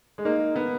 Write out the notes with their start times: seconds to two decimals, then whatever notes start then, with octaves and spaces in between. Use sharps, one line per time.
0.18 G#3
0.25 A#3 D#4
0.56 B3